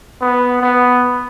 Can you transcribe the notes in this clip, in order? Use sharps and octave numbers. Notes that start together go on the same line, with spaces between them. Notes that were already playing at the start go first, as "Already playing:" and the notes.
B3
B3